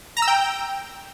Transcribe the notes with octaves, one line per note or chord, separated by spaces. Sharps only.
A#5
E6
G5